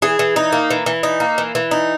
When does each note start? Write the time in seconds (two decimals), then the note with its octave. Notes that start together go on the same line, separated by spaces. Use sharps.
0.02 E3 G#4
0.19 E3
0.36 D#4
0.52 A#3
0.71 E3
0.86 E3
1.03 D#4
1.20 A#3
1.38 E3
1.55 E3
1.71 D#4